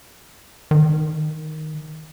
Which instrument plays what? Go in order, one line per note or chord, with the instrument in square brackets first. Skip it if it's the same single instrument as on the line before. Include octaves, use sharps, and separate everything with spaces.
[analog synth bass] D#3